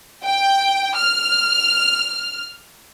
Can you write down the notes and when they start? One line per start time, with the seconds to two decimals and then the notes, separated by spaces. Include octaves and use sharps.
0.23 G5
0.95 F6